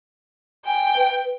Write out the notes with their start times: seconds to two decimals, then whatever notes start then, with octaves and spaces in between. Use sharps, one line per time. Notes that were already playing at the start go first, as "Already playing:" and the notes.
0.66 G5 G#5
0.97 B4